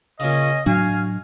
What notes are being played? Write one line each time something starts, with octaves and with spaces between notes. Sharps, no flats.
A#2 C#3 C#4 D#5
A2 F#3 D4 F#4 F5 G#5